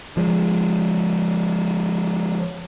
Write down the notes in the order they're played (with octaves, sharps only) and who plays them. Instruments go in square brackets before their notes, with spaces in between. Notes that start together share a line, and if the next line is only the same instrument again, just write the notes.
[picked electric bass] F3 G#3